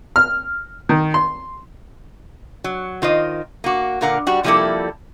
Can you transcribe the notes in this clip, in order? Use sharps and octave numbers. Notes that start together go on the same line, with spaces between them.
F6
D#3
C6
F#3
D#3 F4 C5 D#5
A#3 F#4
A#2 D3 A#4 F5 F#5
G3 F#4
C3 F3 G3 A#3 E4 A4